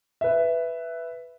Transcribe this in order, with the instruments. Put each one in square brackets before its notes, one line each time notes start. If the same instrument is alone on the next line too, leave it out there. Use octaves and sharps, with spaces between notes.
[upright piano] B4 E5